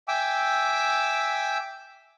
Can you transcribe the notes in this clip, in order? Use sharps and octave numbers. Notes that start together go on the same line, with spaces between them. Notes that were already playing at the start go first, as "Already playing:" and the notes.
E5 G5 G#5 D6 E6